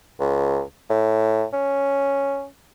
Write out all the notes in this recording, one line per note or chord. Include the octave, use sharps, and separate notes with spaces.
C#2
A2
C#4